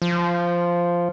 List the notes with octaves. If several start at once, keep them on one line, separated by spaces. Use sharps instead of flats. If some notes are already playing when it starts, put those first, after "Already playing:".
F3